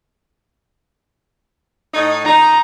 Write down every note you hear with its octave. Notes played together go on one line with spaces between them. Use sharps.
A2 D#4
D#4 A#5